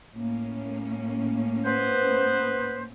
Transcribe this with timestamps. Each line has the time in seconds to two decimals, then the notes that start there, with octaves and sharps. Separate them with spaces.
0.13 A2 A#3 C#4
1.65 B3 B4 C5